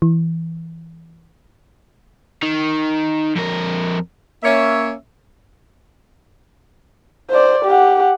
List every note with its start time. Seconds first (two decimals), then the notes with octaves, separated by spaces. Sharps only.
0.02 E3
2.43 D#3
3.35 F2 A#4
4.44 A#3 C#4 C#5 E5
7.30 C5 D5
7.65 G4 F#5